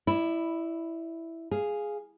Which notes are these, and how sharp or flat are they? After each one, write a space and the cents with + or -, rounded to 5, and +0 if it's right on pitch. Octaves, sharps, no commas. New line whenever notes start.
E4 +0 D5 +40
G#4 +0 F5 +0